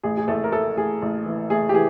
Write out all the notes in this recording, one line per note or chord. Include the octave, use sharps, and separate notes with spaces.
A1 G#4
G#4
A1 A3 A4
A#4
A3 A4
A1 G#4
A1
E3
A3 G#4
G4
E3 G#4